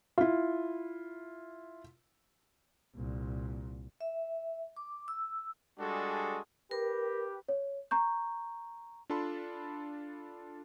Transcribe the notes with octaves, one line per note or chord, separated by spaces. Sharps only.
E4 F4
C2 A#2
E5
D6
E6
G3 G#3 D4 F#4 G#4 A4
G4 A#4 B4
C#5
A#5 C#6 G6
D4 F4 A4 A5 B5 C6